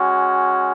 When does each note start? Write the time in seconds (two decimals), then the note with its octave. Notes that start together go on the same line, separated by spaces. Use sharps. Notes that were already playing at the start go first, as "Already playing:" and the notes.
Already playing: G#3 C#4 F#4